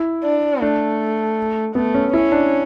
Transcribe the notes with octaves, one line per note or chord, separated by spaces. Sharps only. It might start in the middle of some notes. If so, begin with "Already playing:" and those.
Already playing: E4
D4
A3 D4
A3 B3
C#4
C#4 E4
D4